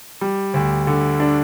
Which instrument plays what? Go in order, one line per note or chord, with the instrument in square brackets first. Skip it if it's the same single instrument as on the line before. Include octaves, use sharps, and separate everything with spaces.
[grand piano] G3
D2
D3
D4